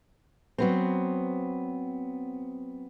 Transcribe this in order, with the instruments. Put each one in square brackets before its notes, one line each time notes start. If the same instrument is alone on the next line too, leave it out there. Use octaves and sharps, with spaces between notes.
[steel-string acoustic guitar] F#3 B3 C4